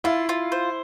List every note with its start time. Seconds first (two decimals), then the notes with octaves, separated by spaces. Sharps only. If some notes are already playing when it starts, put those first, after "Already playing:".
0.04 E4 F4
0.29 F4
0.52 C5